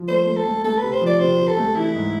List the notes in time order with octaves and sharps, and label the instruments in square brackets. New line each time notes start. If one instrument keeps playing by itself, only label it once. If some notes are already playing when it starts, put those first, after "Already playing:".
Already playing: [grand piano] F3
[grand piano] A3 [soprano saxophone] C5
[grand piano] A3
[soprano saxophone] A4
[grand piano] A3
[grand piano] A3 [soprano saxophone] A4
[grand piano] C3 [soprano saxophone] B4
[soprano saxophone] C5
[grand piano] F3
[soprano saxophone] D5
[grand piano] C3 [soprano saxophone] C5
[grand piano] C3
[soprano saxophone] A4
[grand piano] A3
[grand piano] E3 [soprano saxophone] E4
[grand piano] G#2